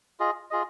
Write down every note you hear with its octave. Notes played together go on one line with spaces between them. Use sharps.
F4 G#4 D#5
F4 G#4 D#5